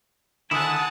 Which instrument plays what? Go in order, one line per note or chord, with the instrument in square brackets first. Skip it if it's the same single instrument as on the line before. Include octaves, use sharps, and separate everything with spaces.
[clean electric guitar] D3 D#3 E4 [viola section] F#5 A5 [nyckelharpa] G#5 [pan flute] D#6